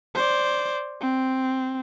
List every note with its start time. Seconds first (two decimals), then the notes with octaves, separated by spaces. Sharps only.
0.15 C5 D5
1.01 C4